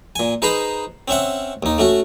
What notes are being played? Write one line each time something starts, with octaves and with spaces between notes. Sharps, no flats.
A#2 G#5
D#4 G#4 B4 C5 A#5 B5
C4 C#4 E5 F#5
D#2 D#4
A3 C#4 F#4